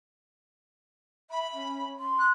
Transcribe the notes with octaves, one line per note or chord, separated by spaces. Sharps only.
E5 B5
C#4
C6
F#6